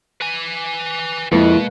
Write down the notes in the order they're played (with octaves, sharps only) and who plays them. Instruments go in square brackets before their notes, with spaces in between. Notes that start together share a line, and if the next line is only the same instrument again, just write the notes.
[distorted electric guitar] B4 G#5
[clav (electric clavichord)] F2 [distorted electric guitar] B2 [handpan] G#3 A#3 B4 [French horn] E4